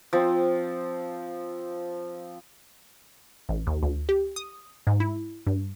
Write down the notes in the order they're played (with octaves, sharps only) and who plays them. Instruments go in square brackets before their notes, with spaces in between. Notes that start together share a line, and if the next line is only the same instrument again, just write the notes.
[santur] F3 C4
[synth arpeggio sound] A1
D#2
D2
G4
D#6
G#2
E4
G2